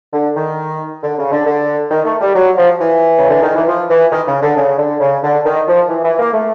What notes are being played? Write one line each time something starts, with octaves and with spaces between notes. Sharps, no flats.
D3
D#3
D3
C#3
D3
D3
D#3
A3
G3
F#3
F3
E3
C#3
D3
D#3
E3
F3
E3
D#3
C#3
D3
C#3
D3
C#3
D3
D#3
F3
E3
E3
A#3
A3